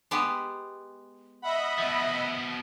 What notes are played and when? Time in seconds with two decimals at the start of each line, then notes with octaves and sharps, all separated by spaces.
0.11 G#3 B3 G4
1.42 D#5 E5 F#5 B5
1.78 B2 F3